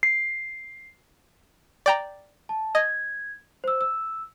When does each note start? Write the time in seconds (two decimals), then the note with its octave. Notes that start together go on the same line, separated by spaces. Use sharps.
0.03 C7
1.86 D5 G5 A#5
2.49 A5
2.75 D#5 G#6
3.64 C5 E6
3.81 E6